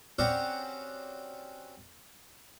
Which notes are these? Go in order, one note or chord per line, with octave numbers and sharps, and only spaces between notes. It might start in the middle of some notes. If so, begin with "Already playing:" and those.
C4 C#4 F#4 G4 D5 F#5